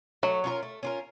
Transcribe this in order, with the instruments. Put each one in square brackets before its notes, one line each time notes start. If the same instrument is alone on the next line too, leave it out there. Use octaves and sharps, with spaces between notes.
[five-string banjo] F#3 [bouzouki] A3
[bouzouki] C#4 F4 A#4
A3
C#4 F4 A#4